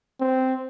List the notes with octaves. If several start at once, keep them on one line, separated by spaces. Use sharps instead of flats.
C4